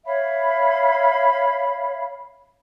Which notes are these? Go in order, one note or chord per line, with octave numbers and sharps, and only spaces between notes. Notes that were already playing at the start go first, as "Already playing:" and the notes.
C#5 E5 F5 B5